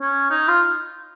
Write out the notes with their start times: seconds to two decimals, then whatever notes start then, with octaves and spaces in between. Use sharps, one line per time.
0.02 C#4
0.31 D#4
0.48 F4